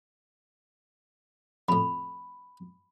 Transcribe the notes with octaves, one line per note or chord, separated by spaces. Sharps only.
F2 A2 B5